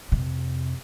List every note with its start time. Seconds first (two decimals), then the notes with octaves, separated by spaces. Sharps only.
0.12 F2 C3